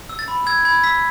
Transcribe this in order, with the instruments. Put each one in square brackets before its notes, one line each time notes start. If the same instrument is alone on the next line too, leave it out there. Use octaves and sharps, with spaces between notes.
[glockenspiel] E6
A6
B5
E6 G#6
B5 G#6
E6 B6